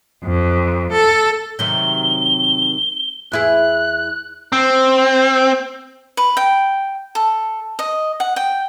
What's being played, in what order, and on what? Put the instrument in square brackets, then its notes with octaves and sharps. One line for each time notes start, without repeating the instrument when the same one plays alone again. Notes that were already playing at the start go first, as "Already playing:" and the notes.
[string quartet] F2
A4
[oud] C3 D#3 F#3 [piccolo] G7
[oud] E2 E4 G#4 [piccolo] F#6
[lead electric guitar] C4
[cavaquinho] B4
G5
A4
D#5
F#5
G5